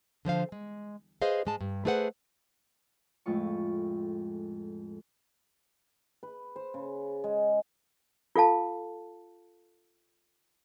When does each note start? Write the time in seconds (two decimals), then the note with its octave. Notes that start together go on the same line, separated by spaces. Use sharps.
0.25 D3 F3 C5 F5
0.52 G#3
1.22 G#4 B4 C5 D#5 F5
1.45 G#2 G#3 A5
1.61 G2
1.85 A3 E4 G#4 B4 C5 F#5
3.26 F2 A2 G#3 F4 C#6
6.23 B4
6.56 C5
6.74 C#3
7.24 G#3
8.36 F4 A4 F5 A5